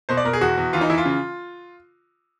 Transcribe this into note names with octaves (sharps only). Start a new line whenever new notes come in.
B2 C5
D5
B2 A#4
G#4
E2 F#4
E2
E3 F4
D#4
E3 E4
F4
C#3